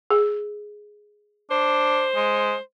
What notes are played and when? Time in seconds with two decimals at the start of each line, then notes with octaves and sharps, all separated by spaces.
0.10 G#4
1.51 D4 C5
2.15 G#3